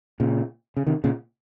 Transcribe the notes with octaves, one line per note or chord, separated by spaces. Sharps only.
A#2 C#3
C#3
C3 D#3
A#2 C#3